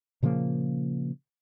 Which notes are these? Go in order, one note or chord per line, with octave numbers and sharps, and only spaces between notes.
A#2 C#3 F3 A#3